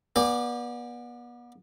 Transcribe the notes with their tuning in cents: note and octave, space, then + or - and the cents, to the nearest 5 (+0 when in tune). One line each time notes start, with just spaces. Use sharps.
B3 -35 D5 +0 G5 +45